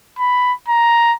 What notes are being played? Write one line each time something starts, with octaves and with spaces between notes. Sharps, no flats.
B5
A#5